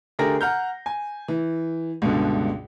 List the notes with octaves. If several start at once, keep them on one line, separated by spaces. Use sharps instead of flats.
D3 A3 G4 G#4 A#4 A#6
F#5 A#5 F6 G6
G#5
E3
C#2 G2 B2 D3